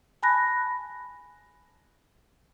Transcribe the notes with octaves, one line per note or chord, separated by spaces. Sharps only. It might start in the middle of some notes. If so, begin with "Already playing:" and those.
G#5 A5 B5 F#6 A#6